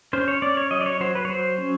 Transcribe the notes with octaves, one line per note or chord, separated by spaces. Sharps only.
C#4 C5
C#5
C#4 D5
C#5
F#3 D#5
D5
C#5
F#3 C5
B4
C#5
F#3 C5
C#4